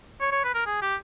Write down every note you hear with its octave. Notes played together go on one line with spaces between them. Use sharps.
C#5
C#5
B4
A#4
G#4
G4